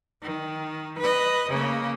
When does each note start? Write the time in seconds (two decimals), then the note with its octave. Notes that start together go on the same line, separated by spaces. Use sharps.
0.22 D#3
0.99 B4 D#5
1.50 C#3 A#3